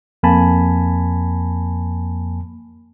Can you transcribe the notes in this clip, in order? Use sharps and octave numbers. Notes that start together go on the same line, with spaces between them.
F2 A#3 G#5 A5 B5